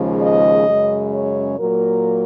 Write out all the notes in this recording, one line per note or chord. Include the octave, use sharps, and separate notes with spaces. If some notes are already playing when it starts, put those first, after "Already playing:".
Already playing: D#2 C#3 F3 G#3
D#5
F#2 C#3 G#3
C#5
A#2 F#3 A#3 A#4